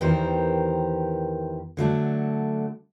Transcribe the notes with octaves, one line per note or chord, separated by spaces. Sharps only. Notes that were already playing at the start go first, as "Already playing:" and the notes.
E2 D#3 E3 G4 A#4 C5
D3 F#3 A3 D4